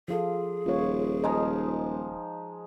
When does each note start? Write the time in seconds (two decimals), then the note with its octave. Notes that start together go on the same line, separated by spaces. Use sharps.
0.08 F3 F4 G#4 A4
0.66 D#1 F4 C#5
1.24 F3 G#3 D#4 D#5